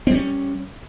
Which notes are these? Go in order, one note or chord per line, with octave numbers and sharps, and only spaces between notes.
G3 C4 C#4